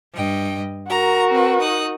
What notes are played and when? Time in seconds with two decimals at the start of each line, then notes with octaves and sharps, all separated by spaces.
0.14 G2 D#5 G5
0.88 F#4 A#4 A#5
1.31 C4 B4
1.60 D#4 D#6 F#6